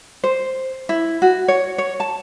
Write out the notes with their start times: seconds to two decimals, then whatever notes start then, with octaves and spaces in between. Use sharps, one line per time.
0.24 C5
0.89 E4
1.22 F#4
1.48 C#5
1.78 C#5
2.00 A5